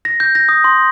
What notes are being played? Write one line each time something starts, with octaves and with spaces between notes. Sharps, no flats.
A#6
G6
A#6
D#6
C6